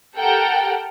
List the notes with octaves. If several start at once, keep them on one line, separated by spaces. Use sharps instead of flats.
G4 A4 A#4 F#5 G5 A5